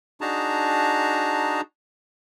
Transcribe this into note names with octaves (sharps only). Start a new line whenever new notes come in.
D4 D#4 F#4 G#4 A5 A#5